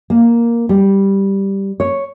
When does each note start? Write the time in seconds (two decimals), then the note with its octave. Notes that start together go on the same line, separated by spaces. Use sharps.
0.10 A#3
0.69 G3
1.80 C#5